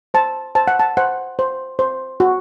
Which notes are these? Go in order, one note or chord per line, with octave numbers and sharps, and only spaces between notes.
C5 A5
C5 A5
F#5
A5
C5 F#5
C5
C5
F#4